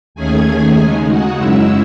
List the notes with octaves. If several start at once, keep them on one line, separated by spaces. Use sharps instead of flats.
D#2 D#3 A3 C#4 G#4 G#5
C#3 G#3 D#4
F#4 F#5
F#2 C#3 G#3 C#4 E4 E5